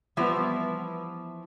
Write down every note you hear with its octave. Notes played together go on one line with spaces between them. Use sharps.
E3 F3 G3 B3 E4